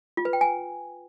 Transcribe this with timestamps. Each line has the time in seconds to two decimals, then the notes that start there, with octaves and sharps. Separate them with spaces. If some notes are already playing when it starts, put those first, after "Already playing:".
0.17 F4
0.25 B4
0.33 G5
0.41 G#5